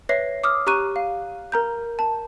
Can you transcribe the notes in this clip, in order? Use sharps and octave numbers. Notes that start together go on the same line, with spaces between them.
B4 C#5 E5 A#6 C7
D6 D#6 F6
G4 A#5 C#6 F#6 D#7
F5
A#4 A#5 G6
A5